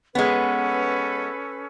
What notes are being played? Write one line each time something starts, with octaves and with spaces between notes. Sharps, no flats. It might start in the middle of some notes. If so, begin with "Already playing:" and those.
G#3 B3 C#4 A4 B4